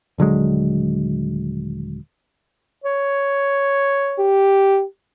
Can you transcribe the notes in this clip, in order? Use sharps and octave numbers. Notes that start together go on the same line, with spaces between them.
D#1 D3 F#3 G#3
C#5
G4